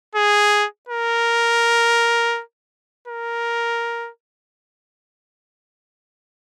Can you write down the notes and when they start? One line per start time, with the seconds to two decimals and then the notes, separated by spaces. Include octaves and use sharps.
0.15 G#4
0.89 A#4
3.08 A#4